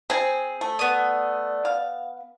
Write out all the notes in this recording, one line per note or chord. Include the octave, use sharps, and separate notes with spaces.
C4 G#4 C5 G#5
A3
B3 D5 D#6
F5